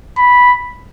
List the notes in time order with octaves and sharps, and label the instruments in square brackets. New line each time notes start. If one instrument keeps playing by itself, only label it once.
[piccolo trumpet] B5